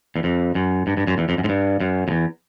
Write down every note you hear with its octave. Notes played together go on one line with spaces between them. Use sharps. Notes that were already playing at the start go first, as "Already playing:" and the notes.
E2
F2
F#2
G2
G2
F#2
E2
F2
F#2
G#2
G2
F#2
F2
E2